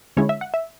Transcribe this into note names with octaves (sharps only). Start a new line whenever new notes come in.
D3 G#3 C#4 E4 C#5
E5
F#5
E5